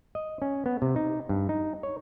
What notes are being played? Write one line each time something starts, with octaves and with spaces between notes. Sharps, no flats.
D#5
C#4
B3
C3
D#4
G2
D#4
C#5